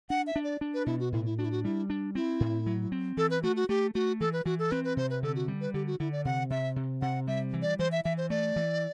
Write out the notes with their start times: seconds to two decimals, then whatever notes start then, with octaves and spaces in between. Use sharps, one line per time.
0.10 D4 F#5
0.27 E5
0.36 D4
0.44 D5
0.61 D4
0.74 B4
0.86 B2 E4
1.00 F#4
1.12 A2 E4
1.25 E4
1.38 D4 F#4
1.45 E4
1.51 F#4
1.64 G3 E4
1.90 D4
2.15 C4 E4
2.40 A2
2.66 F#3
2.92 C4
3.17 E3 A4
3.30 B4
3.43 A3 F#4
3.56 F#4
3.69 A3 G4
3.95 A3 F#4
4.20 E3 A4
4.33 B4
4.45 E3 F#4
4.59 A4
4.71 C4 B4
4.85 B4
4.97 C3 C5
5.10 B4
5.23 D3 A4
5.36 F#4
5.48 G3
5.61 B4
5.74 D3 G4
5.87 F#4
6.00 D3 E4
6.12 D5
6.25 C3 F#5
6.50 C3 E5
6.76 C3
7.02 C3 F#5
7.27 G3 E5
7.53 E3
7.62 D5
7.79 E3 C5
7.92 E5
8.04 E3 E5
8.18 C5
8.30 A3 D5
8.56 E3